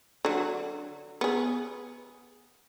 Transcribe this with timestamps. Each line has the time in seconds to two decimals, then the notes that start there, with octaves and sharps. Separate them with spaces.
0.25 D3 F#3
1.21 B3 G#4